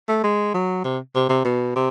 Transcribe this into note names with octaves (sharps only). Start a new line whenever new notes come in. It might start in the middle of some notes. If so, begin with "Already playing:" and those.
A3
G#3
F#3
C3
C3
C3
B2
C3